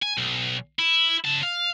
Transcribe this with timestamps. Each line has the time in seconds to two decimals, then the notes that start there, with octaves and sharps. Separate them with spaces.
0.02 G#5
0.17 B1
0.79 E4
1.24 C#3 A5
1.43 F5